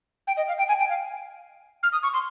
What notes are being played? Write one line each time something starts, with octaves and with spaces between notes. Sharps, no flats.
G5
D#5
F5
G5
G#5
G5
F5
F6
D#6
C#6
C6